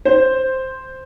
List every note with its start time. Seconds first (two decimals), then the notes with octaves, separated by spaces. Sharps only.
0.05 C5